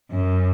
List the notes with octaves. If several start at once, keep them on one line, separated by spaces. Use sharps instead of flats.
F#2